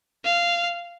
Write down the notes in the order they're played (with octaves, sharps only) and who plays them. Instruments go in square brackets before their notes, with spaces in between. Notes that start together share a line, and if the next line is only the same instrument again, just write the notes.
[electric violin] F5